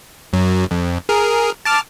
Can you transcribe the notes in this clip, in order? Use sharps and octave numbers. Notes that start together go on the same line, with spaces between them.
F#2 F#3
F2
G#4 A#4
A5 D6 F6